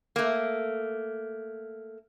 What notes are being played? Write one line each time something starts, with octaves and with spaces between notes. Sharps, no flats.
A3 A#3